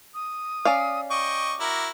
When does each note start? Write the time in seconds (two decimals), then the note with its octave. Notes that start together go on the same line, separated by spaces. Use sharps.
0.14 D#6
0.65 C#4 D5 F5
1.11 D#5 G5 C#6 D6
1.60 E4 F#4 A#4